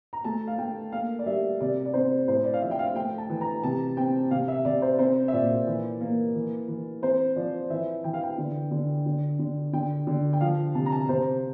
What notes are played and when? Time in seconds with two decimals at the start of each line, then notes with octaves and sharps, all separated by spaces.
0.13 A#5
0.24 A3 A5
0.47 F5
0.58 A3 G5
0.92 A#3 F5
1.19 D5
1.26 G3 E5
1.61 C3 D5
1.86 D5
1.94 C4 C5
2.28 A2 C5
2.44 D5
2.54 F5
2.62 F3 E5
2.71 G5
2.79 F5
2.95 A3 G5
3.18 A5
3.30 E3
3.41 A#5
3.64 C3 A5
3.97 C4 G5
4.31 C3 F5
4.48 E5
4.65 C3 D5
4.82 C5
4.99 C4 C5
5.28 E5
5.33 A#2 D5
5.67 E3
6.01 A#3
6.35 E3
6.68 E3
7.02 C4 C5
7.36 F3 D5
7.70 E3 E5
8.04 E3 G5
8.14 F5
8.23 G5
8.38 D3
8.71 D3
9.06 D3
9.39 D3
9.73 D3 G5
10.07 D3
10.33 G5
10.41 F3 F5
10.75 C3 A5
10.86 A#5
10.92 A5
11.09 C3 C5